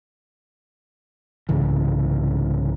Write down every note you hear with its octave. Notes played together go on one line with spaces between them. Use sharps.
C2 G#2 C#3 E3